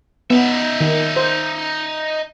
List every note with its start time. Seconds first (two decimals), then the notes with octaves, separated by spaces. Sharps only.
0.30 B3 D#4 E5
0.80 D#3
1.16 C5